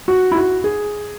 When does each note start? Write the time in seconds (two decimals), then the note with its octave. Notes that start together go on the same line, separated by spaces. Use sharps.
0.08 F#4
0.32 E4
0.36 F#4
0.64 G#4